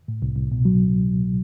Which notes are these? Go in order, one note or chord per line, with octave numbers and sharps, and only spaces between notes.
A2
C2
C2
B2
F#3